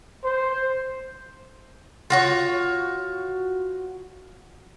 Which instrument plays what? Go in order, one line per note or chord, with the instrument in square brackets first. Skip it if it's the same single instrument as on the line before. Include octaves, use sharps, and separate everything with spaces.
[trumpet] C5
[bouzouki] F4 F#4 C#5